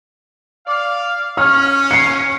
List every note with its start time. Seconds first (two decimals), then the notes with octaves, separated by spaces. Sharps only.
0.67 D5 F5
1.37 C#4 F6
1.91 C7 C#7